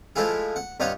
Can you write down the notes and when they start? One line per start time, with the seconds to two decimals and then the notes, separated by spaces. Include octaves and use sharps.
0.16 F3 G#3 A3 E4 F4 G#4
0.56 F#5
0.80 G2 D#4 F4 C#5 D#5 F#5